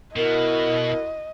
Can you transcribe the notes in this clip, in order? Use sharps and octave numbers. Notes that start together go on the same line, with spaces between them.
B2 E4 F#4 A#4 D#5